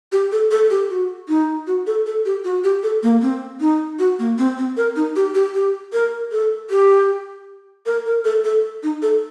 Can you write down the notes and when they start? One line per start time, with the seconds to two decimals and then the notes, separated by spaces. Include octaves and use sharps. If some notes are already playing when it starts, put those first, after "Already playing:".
0.12 G4
0.32 A4
0.51 A4
0.70 G4
0.90 F#4
1.28 D#4
1.67 F#4
1.87 A4
2.06 A4
2.25 G4
2.44 F#4
2.64 G4
2.83 A4
3.03 A#3
3.22 C4
3.60 D#4
3.99 F#4
4.19 A#3
4.38 C4
4.57 C4
4.77 A#4
4.96 D#4
5.16 G4
5.35 G4
5.54 G4
5.93 A#4
6.31 A4
6.70 G4
7.86 A#4
8.06 A#4
8.25 A4
8.44 A4
8.83 D#4
9.02 A4